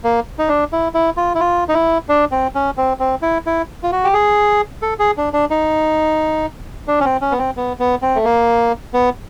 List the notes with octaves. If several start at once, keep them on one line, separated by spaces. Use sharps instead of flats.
A#3
D#4
D4
E4
E4
F4
E4
F4
D#4
E4
D4
C4
C#4
C4
C4
E4
E4
F4
F#4
G4
G#4
A4
G#4
D4
D4
D#4
D4
C#4
C4
C#4
B3
C4
B3
B3
C4
A3
A#3
B3